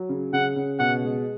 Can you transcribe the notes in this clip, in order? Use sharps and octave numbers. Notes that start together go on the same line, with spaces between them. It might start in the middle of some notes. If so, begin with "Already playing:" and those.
Already playing: F#3
C#3
C#3 F#5
C#3
B2 F#5
G#3